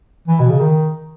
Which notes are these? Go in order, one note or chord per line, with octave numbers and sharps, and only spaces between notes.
E3
B2
C#3
D#3